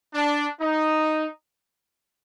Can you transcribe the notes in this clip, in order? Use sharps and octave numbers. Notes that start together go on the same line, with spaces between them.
D4
D#4